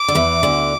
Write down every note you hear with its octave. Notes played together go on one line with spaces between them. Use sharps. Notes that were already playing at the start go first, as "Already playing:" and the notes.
Already playing: D6
D3
E2 E3
D2 D3